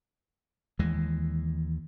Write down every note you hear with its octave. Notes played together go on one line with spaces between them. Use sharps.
D#2 E3 G#3